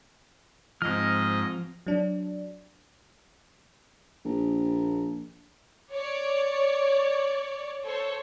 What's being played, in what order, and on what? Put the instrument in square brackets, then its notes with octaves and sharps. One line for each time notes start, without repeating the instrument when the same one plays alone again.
[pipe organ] G#2 D#5 [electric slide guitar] F3 C4 [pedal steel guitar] F6
[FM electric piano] F#3 D4
[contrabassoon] A#1
[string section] C#5 D5
A4 C5 C#5